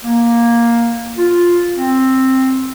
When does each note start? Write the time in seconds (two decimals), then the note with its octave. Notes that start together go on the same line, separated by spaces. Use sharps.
0.05 A#3
1.17 F4
1.77 C4